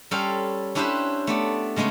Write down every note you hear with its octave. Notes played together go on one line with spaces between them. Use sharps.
G3 C#4 A4 C5 F5 G5
C#4 D4 E4 G4 B4 C5
A3 B3 D5
C#3 G#3 A3 B3 C#4